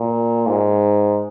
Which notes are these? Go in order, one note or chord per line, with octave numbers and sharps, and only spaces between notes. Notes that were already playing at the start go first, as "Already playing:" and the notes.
Already playing: A#2
G#2